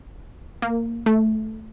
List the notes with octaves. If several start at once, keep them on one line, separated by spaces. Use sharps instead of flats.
A#3
A3